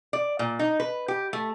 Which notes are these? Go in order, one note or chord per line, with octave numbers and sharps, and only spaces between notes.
D5
A#2
D#4
B4
G4
A3